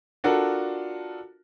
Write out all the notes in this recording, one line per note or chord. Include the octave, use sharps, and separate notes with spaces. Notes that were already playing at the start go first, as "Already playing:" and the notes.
D4 F4 F#4 A4 A#4